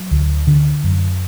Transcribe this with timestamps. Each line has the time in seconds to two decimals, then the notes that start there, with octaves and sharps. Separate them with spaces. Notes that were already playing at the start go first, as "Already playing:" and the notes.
Already playing: F#3
0.11 D2
0.47 D3
0.84 F#2